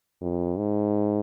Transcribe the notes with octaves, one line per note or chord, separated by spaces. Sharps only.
F2
G#2